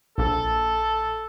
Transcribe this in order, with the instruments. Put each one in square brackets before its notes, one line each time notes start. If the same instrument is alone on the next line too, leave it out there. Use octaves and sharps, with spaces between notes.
[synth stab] A#1 [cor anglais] A4